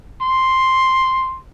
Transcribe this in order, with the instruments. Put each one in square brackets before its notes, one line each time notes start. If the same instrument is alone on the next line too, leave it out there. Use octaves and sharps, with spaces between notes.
[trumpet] C6